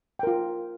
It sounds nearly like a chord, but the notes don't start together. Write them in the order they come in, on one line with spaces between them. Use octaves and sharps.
G5 A#4 F4